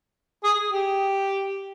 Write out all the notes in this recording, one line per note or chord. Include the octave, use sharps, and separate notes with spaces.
G#4
G4